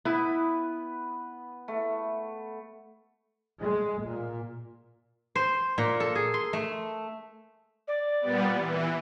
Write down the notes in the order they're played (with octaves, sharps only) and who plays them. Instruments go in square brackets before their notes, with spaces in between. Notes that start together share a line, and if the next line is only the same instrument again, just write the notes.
[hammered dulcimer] B3 B4 [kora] E4
[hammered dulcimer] A3
[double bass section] G#3
A#2
[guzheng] C5
A#2
A4
G#4
C6
A3
[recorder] D5
[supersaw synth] A#2 G3 B3
E3